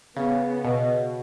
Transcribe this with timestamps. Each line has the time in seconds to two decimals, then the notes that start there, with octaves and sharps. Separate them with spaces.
0.17 C#3 B3
0.65 B2